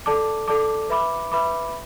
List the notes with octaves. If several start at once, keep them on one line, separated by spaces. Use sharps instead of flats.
A4 D5 A5 D6
A4 D5 A5 D6
B4 E5 B5 D6
B4 E5 B5 D6